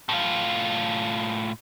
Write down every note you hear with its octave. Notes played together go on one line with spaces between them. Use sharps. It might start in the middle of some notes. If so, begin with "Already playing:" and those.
A2 F4